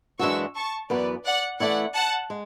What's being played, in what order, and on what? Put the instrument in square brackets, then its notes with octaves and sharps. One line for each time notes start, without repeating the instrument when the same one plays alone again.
[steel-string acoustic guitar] F#2 E3 G#3 D4 F#4 [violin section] C#6 E6
[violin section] A5 C#6
[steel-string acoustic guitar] F#2 E3 B3 [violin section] B4 D5
[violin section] D5 F#5
[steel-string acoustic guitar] E3 A3 C#4 E4 [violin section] D5 F#5
[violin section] F#5 A5
[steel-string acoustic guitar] G#3